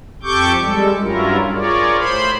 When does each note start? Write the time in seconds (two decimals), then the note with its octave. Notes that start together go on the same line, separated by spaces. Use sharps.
0.23 F2 G4 A4 C#6 D6 G6
0.60 G3 G#3 A4
1.00 G2 F#3 C#4 E4 F4 A#4
1.53 F4 G#4 A#4 C#5 D5
1.97 A2 C5 B5 C6